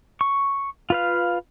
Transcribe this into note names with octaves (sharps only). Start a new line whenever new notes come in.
C#6
F4 B4 F5